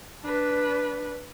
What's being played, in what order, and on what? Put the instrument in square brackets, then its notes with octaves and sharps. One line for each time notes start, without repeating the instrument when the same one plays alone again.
[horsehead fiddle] D4 B4